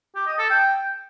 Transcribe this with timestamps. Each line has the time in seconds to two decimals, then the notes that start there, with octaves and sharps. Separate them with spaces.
0.16 G4
0.27 D#5
0.39 A4
0.50 G5